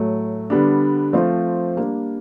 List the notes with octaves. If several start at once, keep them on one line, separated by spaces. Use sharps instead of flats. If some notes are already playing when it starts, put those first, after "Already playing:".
Already playing: A2 F#3 A3
D3 G3 B3 D4
F3 A3 C4 F4
G3 A#3 D4